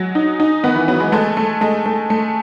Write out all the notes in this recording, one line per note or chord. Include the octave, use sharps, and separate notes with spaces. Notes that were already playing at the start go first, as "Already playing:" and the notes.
Already playing: F#3 G#3
D#4
D#4
D#3 B3
E3
F#3 B3
G#3
G#3 A3
A3
G#3 A3
A3
A3